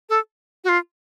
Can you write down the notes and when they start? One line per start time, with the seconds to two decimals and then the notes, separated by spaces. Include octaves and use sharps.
0.09 A4
0.64 F#4
0.69 F4